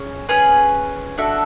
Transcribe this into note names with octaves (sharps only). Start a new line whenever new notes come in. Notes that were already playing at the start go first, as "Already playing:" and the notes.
Already playing: C#4 G#4
C#4 G#4 B4
D4 F#4 A4 E5